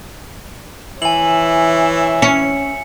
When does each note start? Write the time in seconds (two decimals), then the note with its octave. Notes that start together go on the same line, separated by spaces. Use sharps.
1.02 E3 C#5 E5 G#5 F#7
2.22 C#4 C#7